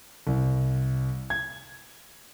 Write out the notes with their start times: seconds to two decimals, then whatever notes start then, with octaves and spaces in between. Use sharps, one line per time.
0.27 C2
1.30 G#6